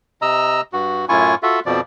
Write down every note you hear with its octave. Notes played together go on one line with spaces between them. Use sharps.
C3 D#5 A#5 E6
G2 F#4
F#2 A2 E4 F4 G#5 C#6
F4 F#4 A4 E5
F2 B2 F3 D5